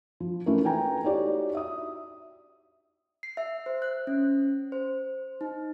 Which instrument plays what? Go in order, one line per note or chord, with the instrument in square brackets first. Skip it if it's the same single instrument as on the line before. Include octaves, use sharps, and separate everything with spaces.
[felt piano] F3
E3 A3 C#4 D#4 F#4 A#4
A4 B4 G5 G#5 A#5
D#4 E4 F#4 G4 C#5 D5
E5 D#6
[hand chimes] C7
E5
C5
F#6
C#4
C5
D#4